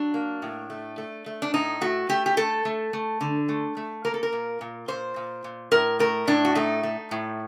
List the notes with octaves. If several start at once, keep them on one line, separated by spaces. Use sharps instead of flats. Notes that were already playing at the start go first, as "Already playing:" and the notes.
Already playing: F#3 D4
A#3
A2
A3
A3
A3
D4
A2 D#4
A3 F#4
A3 G4
G4
A3 A4
A3
A3
D3
A3
A3
A#3 A#4
A4
A#4
A#2
A#2
A#2 C5
A#2
A#2
A2 A#4
A3 A#4
A2 D4
F#4
A3 D#4
A3
A2